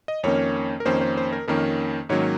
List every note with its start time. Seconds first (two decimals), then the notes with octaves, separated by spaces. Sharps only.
0.08 D#5
0.23 F2 D#3 A#3 C#4 C#5
0.80 A#4
0.85 F2 D#3 A#3 C#4 C5
1.01 C5
1.17 C5
1.33 A#4
1.48 F2 D#3 A#3 C#4 A#4
2.09 G#2 D#3 F#3 A#3 C#4 C#5